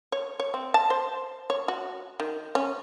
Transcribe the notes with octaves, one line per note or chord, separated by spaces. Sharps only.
C#5
C#5
C4
A5
C5
C#5
F#4
D#3
C#4